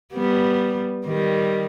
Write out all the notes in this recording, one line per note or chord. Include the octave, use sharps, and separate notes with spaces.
G3 B3
D#3 G3